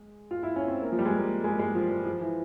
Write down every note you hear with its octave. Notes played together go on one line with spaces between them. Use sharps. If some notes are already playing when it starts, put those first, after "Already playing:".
Already playing: G#3
F4
E4
C#4
C4
A#3
F3
G3
G#3
A#3
G#3
G#3
F3
F3
F3
E3